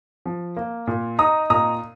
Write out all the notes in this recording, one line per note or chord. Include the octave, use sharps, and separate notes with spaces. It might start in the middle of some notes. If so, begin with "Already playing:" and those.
F3
A#3
A#2
D#4 A#5 D#6
A#2 A#5 D#6